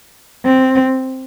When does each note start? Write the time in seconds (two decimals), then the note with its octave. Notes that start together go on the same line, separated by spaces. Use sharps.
0.45 C4